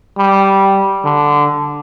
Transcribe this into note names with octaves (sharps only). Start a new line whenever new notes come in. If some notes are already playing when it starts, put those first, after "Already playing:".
G3
D3